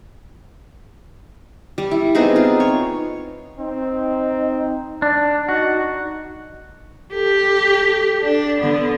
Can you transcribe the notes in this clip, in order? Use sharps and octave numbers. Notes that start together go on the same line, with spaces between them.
G3
E4
B3 C4 D#4 G#4
F4
C#5
C4 D#4
D4 D5
D#4 F#4 F#5
G4 A4
D4
D3 B3